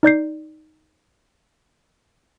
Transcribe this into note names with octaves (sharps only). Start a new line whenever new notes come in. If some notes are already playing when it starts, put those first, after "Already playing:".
D#4 D5 G6 C7